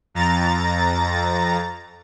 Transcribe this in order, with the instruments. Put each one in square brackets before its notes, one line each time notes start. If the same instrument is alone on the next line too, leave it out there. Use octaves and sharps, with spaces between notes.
[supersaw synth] F2 A#5 A6